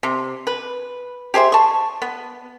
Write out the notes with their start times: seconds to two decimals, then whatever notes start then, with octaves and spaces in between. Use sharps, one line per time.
0.03 C3
0.47 B4
1.34 G4 G#4 C5 E5
1.52 A5 C#6
2.02 B3